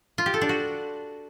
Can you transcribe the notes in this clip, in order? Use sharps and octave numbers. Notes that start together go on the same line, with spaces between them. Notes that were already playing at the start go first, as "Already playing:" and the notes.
F4
G4
A4
D4
F#4